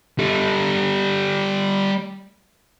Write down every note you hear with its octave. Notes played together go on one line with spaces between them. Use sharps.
G3 A4